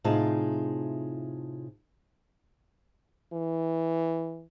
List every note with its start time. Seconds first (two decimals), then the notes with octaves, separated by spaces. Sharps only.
0.04 A2 C3 D#4 F4 G#4 A5
3.33 E3